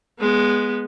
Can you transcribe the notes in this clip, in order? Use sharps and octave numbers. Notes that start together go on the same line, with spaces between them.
G#3 B3